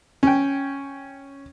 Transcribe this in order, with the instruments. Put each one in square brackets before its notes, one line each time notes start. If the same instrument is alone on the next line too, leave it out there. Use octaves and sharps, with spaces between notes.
[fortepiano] C#4 G5